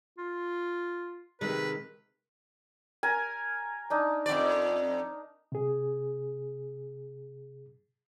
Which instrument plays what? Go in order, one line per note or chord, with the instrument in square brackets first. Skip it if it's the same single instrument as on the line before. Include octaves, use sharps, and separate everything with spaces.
[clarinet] F4
[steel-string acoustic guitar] C3 D#3 G#3 [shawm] B4
[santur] A#4 G#5
D4 D#4
[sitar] F2 D5
[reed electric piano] C3 G#4